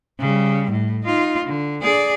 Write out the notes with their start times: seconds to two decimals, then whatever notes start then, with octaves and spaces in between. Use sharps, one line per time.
0.19 C#3 G3
0.71 A2
1.03 D#4 F4
1.45 D3
1.82 G#4 D5